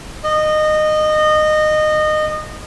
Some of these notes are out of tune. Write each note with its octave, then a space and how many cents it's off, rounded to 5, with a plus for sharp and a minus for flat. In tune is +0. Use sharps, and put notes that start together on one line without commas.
D#5 -20